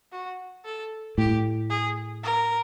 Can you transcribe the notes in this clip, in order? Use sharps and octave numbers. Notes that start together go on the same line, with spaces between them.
F#4
A4
A2 G4
G#4
A#4